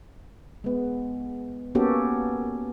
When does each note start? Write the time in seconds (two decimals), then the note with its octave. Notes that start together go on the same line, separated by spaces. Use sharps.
0.64 G#3 B3
1.75 A#3 B3 C#4 F#4 G4 A4